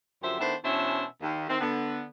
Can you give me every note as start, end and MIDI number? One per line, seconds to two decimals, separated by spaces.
0.22 0.38 42
0.22 0.38 50
0.22 0.38 53
0.22 0.38 67
0.22 0.38 72
0.22 0.38 76
0.39 0.54 51
0.39 0.54 57
0.39 0.54 59
0.39 0.54 62
0.39 0.54 64
0.39 0.54 72
0.64 1.03 47
0.64 1.03 52
0.64 1.03 61
0.64 1.03 62
0.64 1.03 72
0.64 1.03 76
1.22 1.47 39
1.49 1.60 51
1.49 1.60 60
1.60 2.03 50
1.60 2.03 59